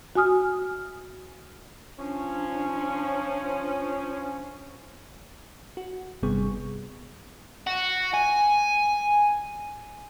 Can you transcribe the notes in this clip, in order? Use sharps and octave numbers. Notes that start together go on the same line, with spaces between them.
F#4 G#5 D#6 F6
F3 C#4 D4
F#4
G1 C3 G3 B3 G#4 C#6
F#4
G#5